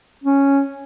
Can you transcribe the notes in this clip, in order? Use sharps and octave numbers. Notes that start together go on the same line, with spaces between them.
C#4